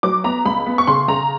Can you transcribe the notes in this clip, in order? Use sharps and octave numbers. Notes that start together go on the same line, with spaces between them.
F#3 D6
B3 A#5
C#2 B5
B3
C#6
C#3 C6
C#3 A#5